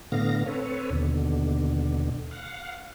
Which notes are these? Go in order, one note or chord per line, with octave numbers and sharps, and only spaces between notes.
A2 D3 B3 F5 A#6
C4 A4 B4 C#5
D#2 B2 D3
F5 F#5